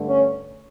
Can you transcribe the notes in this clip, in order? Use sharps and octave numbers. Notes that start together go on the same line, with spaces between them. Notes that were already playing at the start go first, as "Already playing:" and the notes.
Already playing: G2 D3 A3
C#4